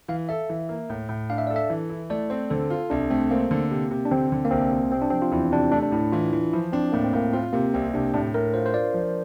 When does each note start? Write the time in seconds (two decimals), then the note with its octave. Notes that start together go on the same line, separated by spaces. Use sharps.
0.08 E3 F5
0.29 A4 E5
0.50 E3
0.69 A#3
0.90 A2
1.09 A2
1.30 D4 F5
1.38 E5
1.47 A4 D5
1.56 E5
1.70 E3
1.90 E4
2.10 A3 D5
2.30 C4 C5
2.50 D3 A4
2.70 F4
2.90 C2 D4
3.10 A3 C4
3.31 A#3 C4
3.51 D3
3.71 C3
3.91 C3
4.06 D4
4.11 D3 C4
4.32 D3
4.45 A#3
4.51 C2 C4
4.72 C2
4.92 C3 C4
5.02 D4
5.11 F3 C4
5.22 F4
5.32 E2 E4
5.52 C3 D4
5.72 A3 D4
5.83 D4
5.92 A2 E4
6.12 E3 F4
6.33 E3
6.53 F3 E4
6.73 C4 D4
6.92 A2 A#3
7.04 C4
7.13 A2 A#3
7.33 C4 F4
7.53 C3 A#3
7.74 C2 C4
7.94 C3 D4
8.14 A2 D4
8.34 A2 A#4
8.54 F4 C5
8.66 C5
8.74 F4 D5
8.94 F3